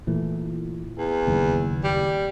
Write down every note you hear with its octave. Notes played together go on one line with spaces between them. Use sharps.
A#2 E3 A3
E2
F#1 D#2
G3